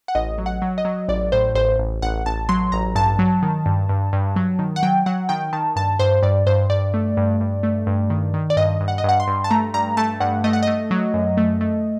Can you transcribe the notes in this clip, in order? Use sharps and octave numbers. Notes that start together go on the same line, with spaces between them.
F#5
A1 D#5
F#3
F#5
F#3
D#5
F#3
A1 D5
A2 C5
A1 C5
A1
A1 F#5
A1 A5
F#3 C6
A1 A#5
G2 A5
F#3
D#3
G2
G2
G2
F#3
D#3
F#5
F#3 G5
F#3 F#5
D#3 G5
D#3 A5
G2 A5
G2 C5
G2 D5
G2 C5
G2 D5
A3
G2
G2
A3
G2
D#3
D#3
D5
G2 D#5
G2
F#5
D#5
G2
F#5
C6
G2
A5
A3 A#5
G2 A#5
A3 A5
G2 F#5
A3 D#5
F#5
A3 D#5
F#3
F#2
A3
A3